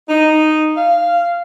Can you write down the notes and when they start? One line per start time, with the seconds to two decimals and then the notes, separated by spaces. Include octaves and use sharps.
0.10 D#4
0.77 F5